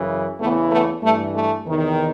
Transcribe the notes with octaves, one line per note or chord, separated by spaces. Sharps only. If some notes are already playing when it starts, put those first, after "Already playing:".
Already playing: F#2 C#3 E3
E2 C#3 E3 A3 B3
A3 B3
G2 E3 A3
A3
E2 C3 D#3